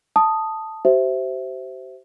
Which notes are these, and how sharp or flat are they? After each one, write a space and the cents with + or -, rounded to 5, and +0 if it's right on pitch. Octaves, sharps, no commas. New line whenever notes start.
A5 +0 D#6 +0
G4 -45 C5 +0 E5 +0